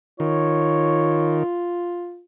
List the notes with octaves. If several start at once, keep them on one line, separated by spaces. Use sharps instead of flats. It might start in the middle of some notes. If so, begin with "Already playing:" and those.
D#3 F4 C#5